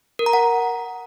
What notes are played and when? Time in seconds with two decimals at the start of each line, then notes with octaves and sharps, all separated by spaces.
0.19 A#4
0.26 A#5
0.33 F#5